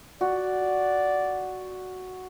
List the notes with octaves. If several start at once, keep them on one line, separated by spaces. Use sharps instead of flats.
F#4 D5